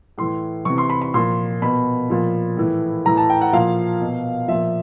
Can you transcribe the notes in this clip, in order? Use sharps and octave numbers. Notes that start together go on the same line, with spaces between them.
A2 E3 C6
C3 E3 C#6
C6
B5
B5
A#2 F3 C6
B2 B5
A#2 F3
A2 E3
A2 E3 A#5
A5
G5
F#5
A#2 F3 F5
B2
A#2 F3 E5